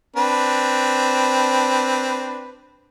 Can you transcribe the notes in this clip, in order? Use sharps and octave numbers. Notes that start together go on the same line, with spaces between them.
C4 D4 B4